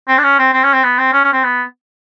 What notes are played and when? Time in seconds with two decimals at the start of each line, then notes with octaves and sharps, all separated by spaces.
0.08 C4
0.18 D4
0.24 C#4
0.39 C4
0.53 C4
0.64 C#4
0.73 C4
0.83 B3
0.98 C4
1.13 C#4
1.24 C#4
1.33 C4
1.44 B3